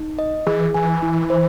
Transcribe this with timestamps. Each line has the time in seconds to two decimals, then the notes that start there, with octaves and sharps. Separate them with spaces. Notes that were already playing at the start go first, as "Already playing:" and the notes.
Already playing: D#4
0.19 D#5
0.47 E3 G#4
0.74 E3 G#5
1.02 E4
1.30 C5